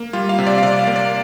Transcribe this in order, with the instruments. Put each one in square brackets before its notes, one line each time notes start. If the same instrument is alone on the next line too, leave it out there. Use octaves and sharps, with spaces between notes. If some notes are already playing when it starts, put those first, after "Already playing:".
Already playing: [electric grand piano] A#3
G3 F4
F5
C3
D5
F5
C3 D5
F5
A#3
D5